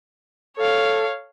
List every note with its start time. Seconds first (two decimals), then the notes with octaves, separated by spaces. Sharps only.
0.57 A4 C#5 F5